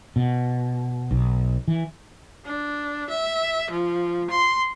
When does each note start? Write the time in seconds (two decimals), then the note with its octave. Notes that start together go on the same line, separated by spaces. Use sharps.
0.16 B2
1.11 B1
1.68 E3
2.44 D4
3.09 E5
3.70 F3
4.29 C6